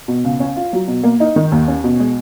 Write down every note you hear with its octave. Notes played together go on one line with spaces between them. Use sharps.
B2
C#2
C#4
F4
F#3
B2
A#3
D#4
D#3
D#2
C#4
B2
G#3